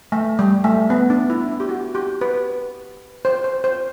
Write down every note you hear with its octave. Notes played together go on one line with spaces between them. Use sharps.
A3
G3
A3
B3
D4
E4
E4
G4
F#4
G4
B4
C5
C5
C5